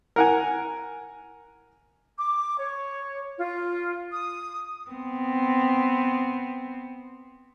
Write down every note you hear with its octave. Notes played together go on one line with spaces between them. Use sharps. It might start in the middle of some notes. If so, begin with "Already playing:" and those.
A#4 F#5 G#5
D6
C#5
F4
D#6
B3 C4